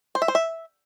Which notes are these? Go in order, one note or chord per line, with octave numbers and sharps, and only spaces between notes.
C5
E5
C5
E5